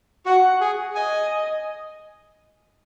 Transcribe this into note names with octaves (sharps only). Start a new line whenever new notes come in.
F#4 F#5
G#4
D#5 G#5